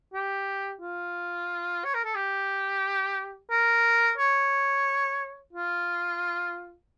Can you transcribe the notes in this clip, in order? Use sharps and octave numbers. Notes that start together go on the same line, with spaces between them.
G4
F4
C#5
A#4
A4
G4
A#4
C#5
F4